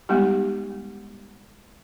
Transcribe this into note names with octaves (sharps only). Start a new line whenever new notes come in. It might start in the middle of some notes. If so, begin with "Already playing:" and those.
G3 G#3 B3 D#4 G4